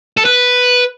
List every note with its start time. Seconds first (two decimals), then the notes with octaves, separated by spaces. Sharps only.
0.17 A4
0.25 B4